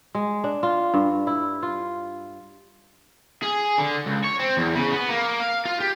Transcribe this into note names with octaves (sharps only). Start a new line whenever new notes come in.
G#3
D4
F4
G2
E4
F4
G#4
D3
C#2
C#5
C4
E2
C#3
B3
A#3
F5
F4
G4